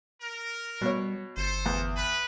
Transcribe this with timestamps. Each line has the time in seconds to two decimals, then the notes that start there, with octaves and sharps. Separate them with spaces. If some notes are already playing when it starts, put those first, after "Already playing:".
0.20 A#4
0.81 B2 G3 C#5
1.37 G1 A4 C5
1.66 E2
1.96 B4